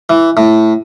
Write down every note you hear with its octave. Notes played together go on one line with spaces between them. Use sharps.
E3
A2